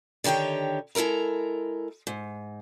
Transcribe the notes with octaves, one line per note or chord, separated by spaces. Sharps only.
D3 D#3 G4 C#5 G5
G#3 E4 A4 A#4 A#5
G#2